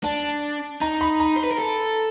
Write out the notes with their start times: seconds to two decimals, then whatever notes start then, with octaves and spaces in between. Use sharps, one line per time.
0.04 D4 A5
0.81 D#4 A#5
1.01 B5
1.20 A#5
1.36 C5
1.44 B4
1.51 A#4
1.59 A4